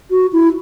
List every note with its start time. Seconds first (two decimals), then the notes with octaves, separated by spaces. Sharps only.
0.10 F#4
0.32 E4